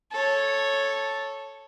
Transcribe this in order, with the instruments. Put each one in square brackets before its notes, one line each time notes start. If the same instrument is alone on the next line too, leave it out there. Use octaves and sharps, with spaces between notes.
[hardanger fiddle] A4 C#5